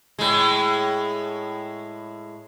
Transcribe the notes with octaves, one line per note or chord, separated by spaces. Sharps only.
A2 G#3